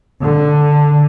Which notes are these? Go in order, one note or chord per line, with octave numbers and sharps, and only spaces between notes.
D3